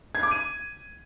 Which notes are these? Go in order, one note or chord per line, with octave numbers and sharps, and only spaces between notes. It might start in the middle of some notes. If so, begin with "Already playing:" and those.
G#6
D6
D#7